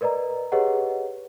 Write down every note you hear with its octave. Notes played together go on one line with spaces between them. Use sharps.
A#4 B4 D5 D#5 A#5
G4 G#4 B4 C#5 D#5 F#5